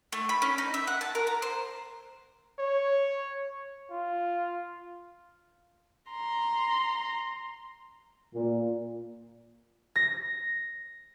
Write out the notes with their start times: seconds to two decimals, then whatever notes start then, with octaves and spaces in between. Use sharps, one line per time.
0.12 A3
0.29 B5
0.42 C#4
0.58 D#4
0.74 E5
0.87 F#5
1.01 A5
1.15 A#4
1.27 A#5
1.42 C5
2.59 C#5
3.90 F4
6.12 A#5 C6
8.34 A#2
9.96 A#6